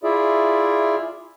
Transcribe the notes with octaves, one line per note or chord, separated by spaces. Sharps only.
E4 F4 G#4 D5 E5